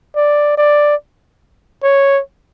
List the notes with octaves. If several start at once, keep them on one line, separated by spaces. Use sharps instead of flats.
D5
D5
C#5